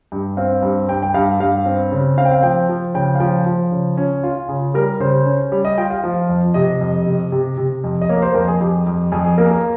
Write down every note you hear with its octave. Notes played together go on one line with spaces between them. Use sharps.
G2
C4 F5
G2
G2 G5
G5
G2 F5
G2 F5
C4
C#3
C4 F5
G5
F5
F3 G5
F3
C#3 G5
F5
F3 G5
F3
C#3
C#4
F4
C#3 G#4
G3 A#4
C#3 C5
C#4
G3 C#5
D#5
F4 G5
F5
F3
F2
C3 D#5
F2
C3
C3
C3
F2
D#5
A#3 C#5
A#4
C5
F2 A#4
G#4
F2 G4
F2
F2 G#4
G#4
A#3 A#4
A#4